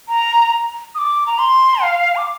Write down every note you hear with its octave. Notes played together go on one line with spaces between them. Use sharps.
A#5
D#6
D6
A#5
C6
F5
D6